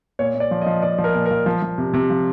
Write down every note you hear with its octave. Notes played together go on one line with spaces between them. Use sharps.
A#2 C#5
A#2
D5
F3
D#5
F3
F3 D5
F3
A#4
A#2
A#4
F3
F3
F3
C3
C3
F3